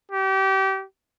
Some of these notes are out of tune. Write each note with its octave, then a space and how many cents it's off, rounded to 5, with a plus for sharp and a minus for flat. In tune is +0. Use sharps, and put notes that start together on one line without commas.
G4 -30